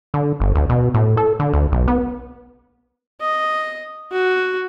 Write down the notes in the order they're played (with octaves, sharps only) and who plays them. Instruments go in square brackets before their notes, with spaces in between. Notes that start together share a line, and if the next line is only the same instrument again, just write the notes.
[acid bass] D3
G1
D2
B2
A2
A4
D3
D2
B1
B3
[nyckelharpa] D#5
F#4